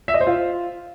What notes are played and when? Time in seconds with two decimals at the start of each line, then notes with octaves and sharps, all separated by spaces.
0.08 E5
0.14 D#5
0.21 C5
0.27 F4